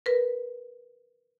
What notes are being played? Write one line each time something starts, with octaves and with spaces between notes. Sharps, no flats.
A#4 B4